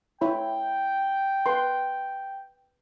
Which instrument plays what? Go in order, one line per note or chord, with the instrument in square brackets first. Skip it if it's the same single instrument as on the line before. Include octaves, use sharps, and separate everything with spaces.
[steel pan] E4 C#5 B5 [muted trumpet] G5
[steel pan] B4 C6